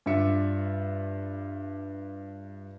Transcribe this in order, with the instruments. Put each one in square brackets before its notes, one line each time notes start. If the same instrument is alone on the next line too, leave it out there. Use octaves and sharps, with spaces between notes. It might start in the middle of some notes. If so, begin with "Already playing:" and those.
[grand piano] G2 D4 F4 E5 C#7